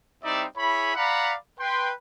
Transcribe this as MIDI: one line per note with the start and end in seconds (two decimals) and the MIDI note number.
0.24 0.45 55
0.24 0.45 60
0.24 0.45 63
0.24 0.45 64
0.24 0.45 74
0.24 0.45 76
0.57 0.93 64
0.57 0.93 68
0.57 0.93 73
0.57 0.93 83
0.96 1.34 74
0.96 1.34 77
0.96 1.34 78
0.96 1.34 82
0.96 1.34 83
1.60 1.92 71
1.60 1.92 79
1.60 1.92 84